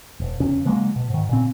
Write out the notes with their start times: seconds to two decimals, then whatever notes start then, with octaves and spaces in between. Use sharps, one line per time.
0.20 E1
0.40 F1 E2 C#3 C#4
0.65 C#3 F#3 G#3 A#3
0.96 B2
1.10 G#2 D#3
1.29 A#2 C#3 C4